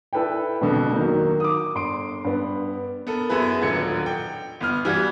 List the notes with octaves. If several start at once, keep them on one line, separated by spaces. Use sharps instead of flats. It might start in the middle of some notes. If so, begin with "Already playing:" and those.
E4 A4 B4 D5 G5
F2 B2 D3
D#3 F#3 A#3
D6 D#6
G1 C6 D7
G2 B3
B3 A4 A#4
F#2 B3 E4 G#4 B4
D#1 A1 D3 F#3 G#6 C#7
G5
G1 B3 F6
E3 G3 F#4 G#6